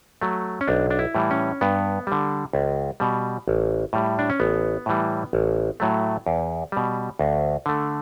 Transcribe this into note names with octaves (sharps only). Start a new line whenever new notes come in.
F#3 A3
C#4
B1 D4
D4
E4
A2 E3 G3
C#4
G2 B3
D3 G3
C#2
B2 G3
A1
A2 G3
D4
C#4
A1 B3
A2 E3 G3
A1
A2 F#3 A3
E2
B2 G3
D2
D3 A3